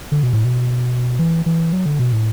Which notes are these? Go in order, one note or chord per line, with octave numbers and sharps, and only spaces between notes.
D3
B2
A2
B2
E3
E3
F#3
D3
B2
A2